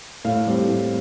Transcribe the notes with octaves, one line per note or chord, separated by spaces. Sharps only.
A2 F5
G3 C4
A2